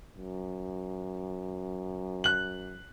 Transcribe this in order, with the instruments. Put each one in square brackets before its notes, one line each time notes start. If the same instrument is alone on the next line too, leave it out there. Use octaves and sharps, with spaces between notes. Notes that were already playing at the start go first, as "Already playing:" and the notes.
[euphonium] F#2
[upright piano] F#6 F#7